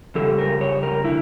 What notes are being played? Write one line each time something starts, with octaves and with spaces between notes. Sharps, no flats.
F2 C#3 G3 A4
A#4
C#5
A#4
D3 E4